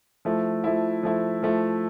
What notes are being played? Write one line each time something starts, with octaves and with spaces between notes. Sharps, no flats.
F3 A3 E4
F3 A3 E4
F3 A3 E4
F3 A3 E4